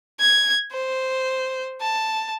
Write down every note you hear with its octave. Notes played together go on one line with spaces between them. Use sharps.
G#6
C5
A5